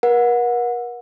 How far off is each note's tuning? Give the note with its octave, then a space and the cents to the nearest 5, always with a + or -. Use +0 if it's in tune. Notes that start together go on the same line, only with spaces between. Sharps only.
A#4 +45 F#5 -25